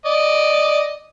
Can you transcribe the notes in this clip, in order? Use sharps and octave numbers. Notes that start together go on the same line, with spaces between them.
D5 D#5